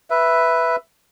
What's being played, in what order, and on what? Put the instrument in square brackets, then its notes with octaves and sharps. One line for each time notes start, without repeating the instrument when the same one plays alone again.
[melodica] B4 E5